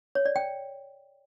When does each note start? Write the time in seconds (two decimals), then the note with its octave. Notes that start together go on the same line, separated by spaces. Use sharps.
0.15 C#5
0.26 D5
0.36 G5